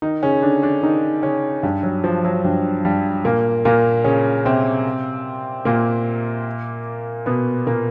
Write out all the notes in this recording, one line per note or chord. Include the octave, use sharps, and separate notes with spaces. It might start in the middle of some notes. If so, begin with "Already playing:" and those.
D#3 D#4
C#3 C#4
D3 D4
D3 D4
D#3 D#4
C#3 C#4
G2 G3
F#3
F3
F#3
G2 G3
G2 G3
A#2 A#3
A#2 A#3
C#3 C#4
C3 C4
A#2 A#3
B2 B3
A#2 A#3